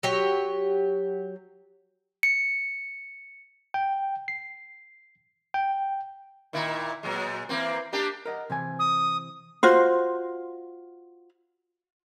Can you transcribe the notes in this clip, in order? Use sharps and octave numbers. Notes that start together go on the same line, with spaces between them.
F#3 G4 C#5
C#7
G5
C7
G5
A#2 D#3 E4
A#2 F#3 G#3
E3 A#3 C4
A#3 D4 G4
A#4 D#5 F#5
C3 E3 G#5
D#6
F4 F#4 C5